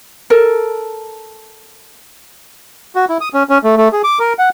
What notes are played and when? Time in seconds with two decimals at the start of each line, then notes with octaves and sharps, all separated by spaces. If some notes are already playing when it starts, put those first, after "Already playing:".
0.30 A4 A#4
2.95 F#4
3.09 E4
3.21 D#6
3.34 C#4
3.49 C#4
3.64 A3
3.77 A3
3.93 G#4
4.04 D6
4.19 A#4
4.39 F#5